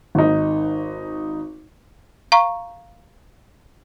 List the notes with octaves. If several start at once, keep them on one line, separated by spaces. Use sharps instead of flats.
G#1 D#4
F5 A#5 C#6